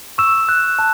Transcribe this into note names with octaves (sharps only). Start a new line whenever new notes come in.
C#6 E6 E7
F#6
A5